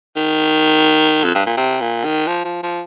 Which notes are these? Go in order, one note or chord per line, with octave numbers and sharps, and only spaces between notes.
D#3
F2
G2
A#2
C3
A#2
D#3
F3
F3
F3